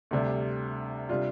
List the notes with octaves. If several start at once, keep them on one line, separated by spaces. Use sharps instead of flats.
D2 C3 G3 D4
C3 G3 D4 F4